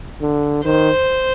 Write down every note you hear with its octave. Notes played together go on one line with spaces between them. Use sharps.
D3
D#3 C5